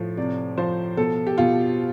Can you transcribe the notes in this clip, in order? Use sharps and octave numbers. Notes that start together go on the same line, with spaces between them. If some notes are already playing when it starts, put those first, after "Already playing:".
Already playing: A2 F3
C3 D5
F3 C5
B2 A4
G4
B2 F4